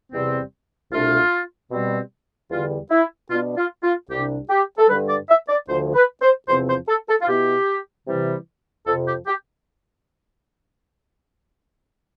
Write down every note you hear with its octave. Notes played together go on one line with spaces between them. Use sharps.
E2 C3 G3 C4
C2 B2 A3 D4 F4
B2 G3 C4
E2 D3 G3 F4
E4
B2 B3 D4 F4
F4
F4
C2 C3 G3 D4 G4
G4
A4
G2 D3 G3 B4
D5
E5
D5
D2 D3 F3 C5
B4
C5
E2 C3 F3 C4 C5
C5
A4
A4
F4
B2 B3 E4 G4
C3 E3 G3
F2 C3 F3 A4
G4
G4